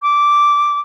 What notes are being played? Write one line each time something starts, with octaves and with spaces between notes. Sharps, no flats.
D6